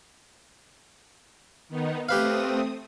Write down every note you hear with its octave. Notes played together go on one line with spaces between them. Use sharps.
D#3 B3 D#4
A3 C4 G4 B4 F5 D#6